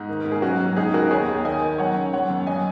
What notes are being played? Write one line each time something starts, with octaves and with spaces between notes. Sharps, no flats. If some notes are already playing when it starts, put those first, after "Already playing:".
Already playing: G#2 D#4
D#3
G#2 A#4
G#4
F#3 C#4 F#4
F#3
C#2 D#4 G#4
C#2 F#4 A#4
D#2 G#4 C#5
D#2
D#3 D#5 G#5
D#3
F#3 C#5 F#5
C#3
F#3 C#5 F#5
F#2
F#3 D#5 G#5